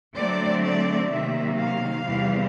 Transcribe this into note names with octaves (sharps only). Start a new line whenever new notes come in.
D3 F#3 A3 C4 D5
D5
C3 D#3 F#3 A#3 E5
F5
E2 C3 E3 G3 B3